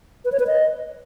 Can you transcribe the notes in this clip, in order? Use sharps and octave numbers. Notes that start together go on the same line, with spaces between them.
B4
C#5
B4
D#5